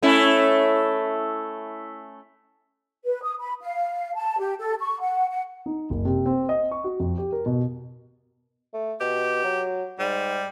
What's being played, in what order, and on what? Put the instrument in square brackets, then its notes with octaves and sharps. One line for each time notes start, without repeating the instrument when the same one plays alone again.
[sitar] A3 C#4 E4
[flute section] B4
D#6
B5
F5
A5
G4
A4
C#6
F#5
F#5
[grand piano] D#4
F#1
C3
C4
D#5
C#6
F#4
F2
G4
A#4
B2
[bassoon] A3
[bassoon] B2 [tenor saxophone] G4
[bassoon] F#3
[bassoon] G#2 [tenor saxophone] G3